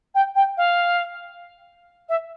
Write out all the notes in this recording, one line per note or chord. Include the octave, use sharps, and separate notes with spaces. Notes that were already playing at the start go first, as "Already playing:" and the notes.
G5
G5
F5
E5